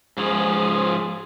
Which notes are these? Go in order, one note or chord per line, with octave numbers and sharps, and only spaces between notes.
G#2 F3 G#4